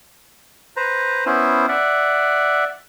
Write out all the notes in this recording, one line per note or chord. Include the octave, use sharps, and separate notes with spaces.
B4 C5 A#5
B3 C#4 E4 C5
D5 E5 F#5